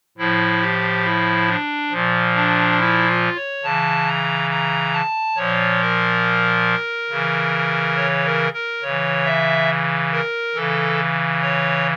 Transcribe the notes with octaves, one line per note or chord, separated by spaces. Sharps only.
A2 F3 E4
G4
E4
D4
A#2 F3
D4
E4
F4
C#5
C#3 E3 A5
A#5
A#5
A5
A#2 F3 C#5
A#4
C#3 E3
C#5
A#4
A#4
C#3 E3 C#5
E5
A#4
C#3 E3 A4
C#5